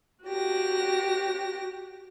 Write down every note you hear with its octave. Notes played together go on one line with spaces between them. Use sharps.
F#4 G4 A#6